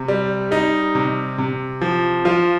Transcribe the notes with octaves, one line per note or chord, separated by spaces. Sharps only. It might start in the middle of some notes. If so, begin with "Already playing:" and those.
Already playing: C3
G3
G3 D#4
C3
C3
F3
F3 F4